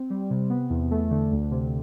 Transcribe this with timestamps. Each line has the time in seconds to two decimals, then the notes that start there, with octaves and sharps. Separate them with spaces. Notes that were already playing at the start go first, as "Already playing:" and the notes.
Already playing: C4
0.10 G3
0.30 C3
0.50 B3
0.70 E2
0.91 A3
1.11 D3
1.32 D2
1.51 C3